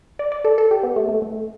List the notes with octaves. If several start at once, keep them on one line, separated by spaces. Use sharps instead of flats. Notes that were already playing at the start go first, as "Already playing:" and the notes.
D5
D5
A4
A4
G4
B3
A3
A3
A3